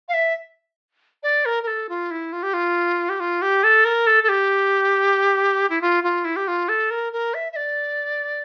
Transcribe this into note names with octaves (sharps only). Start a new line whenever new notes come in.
F5
E5
D5
A#4
A#4
A4
F4
E4
F4
G4
F4
G4
F4
G4
A4
A#4
A4
A4
G4
E4
F4
F4
E4
G4
F4
A4
A#4
A#4
E5
E5
D5